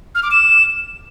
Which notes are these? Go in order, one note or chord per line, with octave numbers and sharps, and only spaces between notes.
F6
D6
E7